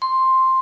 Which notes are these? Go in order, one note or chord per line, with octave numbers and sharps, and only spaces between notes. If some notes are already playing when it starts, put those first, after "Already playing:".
C6